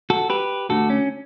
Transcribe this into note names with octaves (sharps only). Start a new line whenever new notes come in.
F#4 A4
G4 B4
D2 D3 A3 F#4 A4
C#4